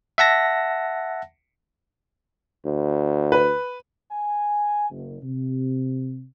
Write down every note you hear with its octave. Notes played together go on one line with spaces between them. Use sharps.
E5 F#5 A5 A#6
D2
B4
G#5
F#1
C3